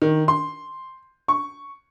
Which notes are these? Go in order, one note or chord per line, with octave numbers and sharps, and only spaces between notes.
D#3
C6
C#6